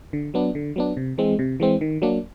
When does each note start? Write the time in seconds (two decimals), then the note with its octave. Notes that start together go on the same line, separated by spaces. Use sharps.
0.13 D3
0.34 F#3 B3 D4
0.55 D3
0.76 F#3 B3 D4
0.97 C3
1.18 E3 G#3 C4
1.39 C3
1.60 E3 G#3 C4
1.81 D#3
2.02 F#3 A#3 D4